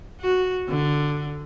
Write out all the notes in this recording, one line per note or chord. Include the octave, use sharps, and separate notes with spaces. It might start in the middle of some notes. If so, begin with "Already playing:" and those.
F#4
D3